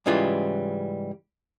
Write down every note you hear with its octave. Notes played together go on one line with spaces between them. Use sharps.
G#2 C#3 E3 G3 F4